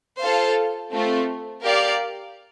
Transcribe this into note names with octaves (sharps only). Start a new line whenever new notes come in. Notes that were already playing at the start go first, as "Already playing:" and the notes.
F4 A4 C5 F5 A5
A3 C4 F4
G4 A#4 D5 F5